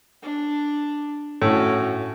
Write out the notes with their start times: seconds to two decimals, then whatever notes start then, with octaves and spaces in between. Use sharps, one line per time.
0.23 D4
1.42 A2 C#4 F#4